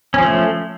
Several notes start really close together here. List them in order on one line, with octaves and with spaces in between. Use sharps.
C#4 F3 A3